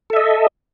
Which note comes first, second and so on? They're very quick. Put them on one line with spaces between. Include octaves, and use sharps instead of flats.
A4 E5 D#5